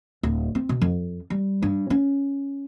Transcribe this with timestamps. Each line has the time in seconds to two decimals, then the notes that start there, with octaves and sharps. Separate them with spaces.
0.23 D1
0.55 C4
0.69 B2
0.82 F2
1.30 G3
1.63 G2
1.90 C#4